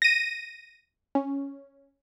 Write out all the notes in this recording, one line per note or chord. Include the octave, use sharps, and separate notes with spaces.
A#6 D#7
C#4